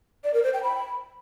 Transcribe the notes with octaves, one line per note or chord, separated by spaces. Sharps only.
D5
A#4
C5
G5
B5